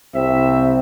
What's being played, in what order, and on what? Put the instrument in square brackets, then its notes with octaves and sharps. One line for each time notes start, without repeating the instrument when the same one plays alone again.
[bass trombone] C2 [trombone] C4 [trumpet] E5